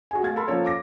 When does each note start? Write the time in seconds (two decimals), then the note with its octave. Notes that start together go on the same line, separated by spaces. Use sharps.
0.11 F#4 G#4 G#5
0.23 A3 F5 G#6 A6
0.36 A4 A#4 A5 B5 C6
0.48 F3 A#3 C#4 A4 C#5
0.66 D6 A#6